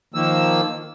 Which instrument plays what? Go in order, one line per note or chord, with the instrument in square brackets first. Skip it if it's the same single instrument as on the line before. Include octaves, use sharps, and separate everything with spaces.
[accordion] D#3 F3 A#3 E6